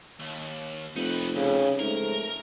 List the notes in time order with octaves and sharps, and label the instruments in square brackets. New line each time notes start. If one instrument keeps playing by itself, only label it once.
[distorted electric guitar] D#2
[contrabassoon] F1 [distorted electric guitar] D#4 B4
[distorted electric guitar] C2 [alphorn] C#3
[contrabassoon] G#2 [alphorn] A3 [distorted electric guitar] A#4